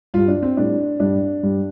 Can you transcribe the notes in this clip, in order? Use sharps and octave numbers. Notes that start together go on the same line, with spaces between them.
G2 G3 F4
D4
C4
A2 G3 D4
G2 G3 D4
G2 G3